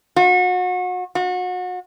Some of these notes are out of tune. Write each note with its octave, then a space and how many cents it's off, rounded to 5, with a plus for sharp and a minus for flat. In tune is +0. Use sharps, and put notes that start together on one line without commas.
F#4 -30
F#4 -30